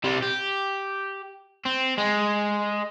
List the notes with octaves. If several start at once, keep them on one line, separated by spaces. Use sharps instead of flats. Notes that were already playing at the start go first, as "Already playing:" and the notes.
C3 G3
G4
C4
G#3